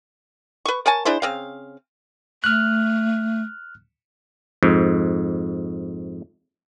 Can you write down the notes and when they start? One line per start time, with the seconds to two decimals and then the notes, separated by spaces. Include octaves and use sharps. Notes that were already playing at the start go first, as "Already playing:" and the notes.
0.65 B4 C#6
0.86 A#4 C#5 G#5 A5
1.05 D4 E4 G#4 C5
1.22 C#3 C4 F5
2.44 A3 F6 F#6
4.63 F2 G#2